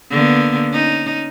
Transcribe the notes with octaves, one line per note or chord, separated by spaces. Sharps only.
D3 A#3 B3
C#4 D#4